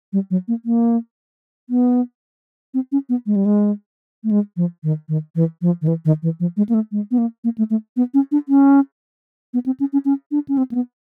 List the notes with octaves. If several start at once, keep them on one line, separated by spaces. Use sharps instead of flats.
G3
F#3
A#3
A#3
B3
C4
C#4
B3
G#3
G3
G#3
A3
G#3
F3
D#3
D#3
E3
F3
D#3
E3
D#3
E3
F3
G#3
A#3
A3
G#3
B3
A#3
A#3
A3
A3
B3
C#4
D4
C#4
B3
C4
C#4
C#4
C#4
D4
C#4
C4
A#3
B3